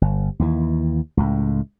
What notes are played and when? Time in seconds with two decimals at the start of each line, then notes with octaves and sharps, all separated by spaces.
0.01 G1
0.39 D#2 E3
1.17 C#2 A2